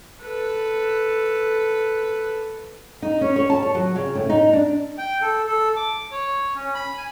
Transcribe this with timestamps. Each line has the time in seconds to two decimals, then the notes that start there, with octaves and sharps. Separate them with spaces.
0.23 A4 B4
3.02 D#4
3.21 C#4
3.36 C#5
3.50 A5
3.62 C#5
3.75 F#3
3.96 C#3
4.15 A2
4.29 D#4
4.53 D4
4.98 G5
5.22 A4
5.48 A4
5.76 D6
6.12 C#5
6.55 C#4
6.74 B5
6.98 G#5